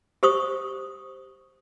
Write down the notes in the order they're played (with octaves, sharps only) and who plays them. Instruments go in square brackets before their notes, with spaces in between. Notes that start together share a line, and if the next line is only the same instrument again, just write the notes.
[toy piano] G4 C5 C#6 D#6